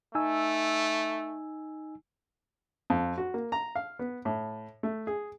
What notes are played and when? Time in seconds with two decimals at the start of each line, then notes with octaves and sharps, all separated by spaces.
0.15 A3 D#4 G#5 E6
2.90 F2
3.18 F#4
3.34 A#3
3.52 A#5
3.75 F5
3.99 B3
4.25 A2
4.83 A3
5.07 G#4